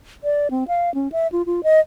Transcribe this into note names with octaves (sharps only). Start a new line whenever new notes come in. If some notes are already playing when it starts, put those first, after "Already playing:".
D5
C4
F5
C#4
E5
F4
F4
D#5